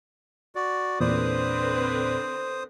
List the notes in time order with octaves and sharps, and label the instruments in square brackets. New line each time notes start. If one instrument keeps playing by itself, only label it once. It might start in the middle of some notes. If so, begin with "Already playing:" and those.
[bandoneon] F#4 D5
[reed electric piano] E2 A#2 D5 [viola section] D3 C4 B4 [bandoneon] C5 D#6